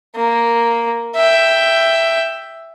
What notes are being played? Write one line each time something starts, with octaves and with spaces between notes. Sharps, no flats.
A#3
E5 G5